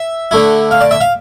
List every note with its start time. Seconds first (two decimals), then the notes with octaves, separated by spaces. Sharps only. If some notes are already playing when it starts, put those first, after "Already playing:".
Already playing: E5
0.31 D3 A3 E4
0.71 F5
0.81 D5
0.91 E5
1.01 F5